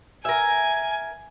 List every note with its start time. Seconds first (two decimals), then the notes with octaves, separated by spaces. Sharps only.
0.25 A#4 E5 G#5